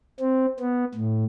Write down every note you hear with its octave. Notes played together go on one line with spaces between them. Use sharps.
C4
B3
A2